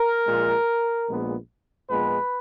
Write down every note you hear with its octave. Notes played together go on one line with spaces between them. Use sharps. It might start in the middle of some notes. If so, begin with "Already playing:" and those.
Already playing: A#4
A#1 A#2 G#3
A#1 A#2 G#3 B3
A#1 A#2 G#3 B3 B4